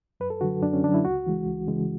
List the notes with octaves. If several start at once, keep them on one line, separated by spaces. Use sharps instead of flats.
F#2 B4
A4
D3 F#3 F#4
F#2 D4
C#4
D3 F#3 D4
E4
C#2 F#4
C#3 E3 G#3
C#2
C#3 E3 G#3